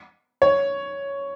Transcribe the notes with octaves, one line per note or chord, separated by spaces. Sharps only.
C#5